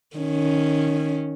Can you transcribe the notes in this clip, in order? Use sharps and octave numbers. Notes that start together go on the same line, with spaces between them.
D#3 C#4